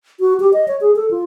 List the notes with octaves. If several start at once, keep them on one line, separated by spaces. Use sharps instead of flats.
F#4
G4
D#5
C#5
G#4
A4
F4